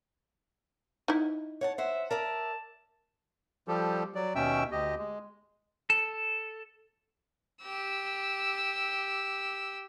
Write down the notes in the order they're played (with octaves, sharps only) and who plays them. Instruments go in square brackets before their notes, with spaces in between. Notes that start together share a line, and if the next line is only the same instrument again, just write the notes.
[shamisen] D#4 E4
[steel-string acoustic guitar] C#5 F#5 A5
[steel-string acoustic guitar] C5 F#5 [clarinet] E5
[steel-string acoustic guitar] A#4 D5 E5 [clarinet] A5
[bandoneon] F3 G3 G4 A4
F#3 D5
D#2 B2 C#4 E5 G5 E6
D2 G4 D#5
G#3
[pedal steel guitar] A4
[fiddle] G4 E6